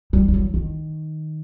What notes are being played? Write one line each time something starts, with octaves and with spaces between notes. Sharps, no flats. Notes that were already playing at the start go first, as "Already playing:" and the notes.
G3
F3
F#3
D#3